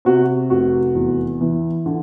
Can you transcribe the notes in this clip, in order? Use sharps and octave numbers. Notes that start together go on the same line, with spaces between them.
C3 F#4
F1 F#4
E2
E3
D3